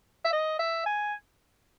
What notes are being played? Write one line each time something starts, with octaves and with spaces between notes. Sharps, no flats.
E5
D#5
E5
G#5